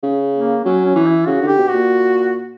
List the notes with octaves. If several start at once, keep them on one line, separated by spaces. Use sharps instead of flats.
C#3
A#3
F#3 C#4
C#4
E3
E4
C#3 F#4
D3
G4
B2
F#4
A#2